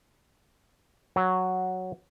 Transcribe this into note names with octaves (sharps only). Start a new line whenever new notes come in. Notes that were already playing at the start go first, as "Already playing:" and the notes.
F#3